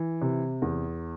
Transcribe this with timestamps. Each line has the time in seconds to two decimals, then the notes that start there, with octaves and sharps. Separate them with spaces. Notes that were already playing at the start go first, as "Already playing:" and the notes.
Already playing: E3
0.22 C3
0.62 E2